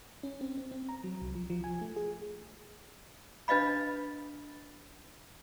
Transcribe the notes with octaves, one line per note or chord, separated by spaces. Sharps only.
C#4
C4
C4
C4
A#5
F#3
C2
F3
F3
G#5
A3
G#4
D4 B4 D#5 F5 B5